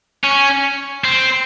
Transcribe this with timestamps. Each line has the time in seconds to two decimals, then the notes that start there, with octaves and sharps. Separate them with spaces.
0.24 C#4
1.04 C4